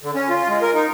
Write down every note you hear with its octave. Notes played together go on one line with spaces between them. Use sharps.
D3
C#4
F4
G#3
A#4
D#4